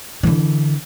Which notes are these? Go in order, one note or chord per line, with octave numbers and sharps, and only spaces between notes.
D3 E3